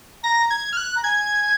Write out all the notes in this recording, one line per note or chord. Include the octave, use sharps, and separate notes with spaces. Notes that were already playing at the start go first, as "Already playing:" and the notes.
A#5 A#6
G#6
F6
F#6
A#5
G#5 G#6